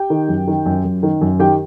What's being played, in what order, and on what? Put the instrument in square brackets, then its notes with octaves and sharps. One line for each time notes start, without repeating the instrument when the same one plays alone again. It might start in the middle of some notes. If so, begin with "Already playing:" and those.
Already playing: [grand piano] G4 G5
D#3
F#2
D#3
F#2
F#2
D#3
F#2
D#3 G4 G5